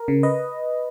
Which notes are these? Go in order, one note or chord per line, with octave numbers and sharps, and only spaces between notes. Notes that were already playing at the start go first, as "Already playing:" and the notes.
Already playing: A#4
C#3
B4 D#5